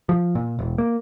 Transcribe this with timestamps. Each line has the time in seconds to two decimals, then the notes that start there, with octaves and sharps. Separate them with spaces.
0.09 F3
0.35 A#2
0.59 E1
0.78 A#3